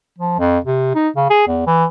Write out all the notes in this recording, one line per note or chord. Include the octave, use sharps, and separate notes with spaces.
F3
F2
C3
D#4
C#3
G#4
E2
E3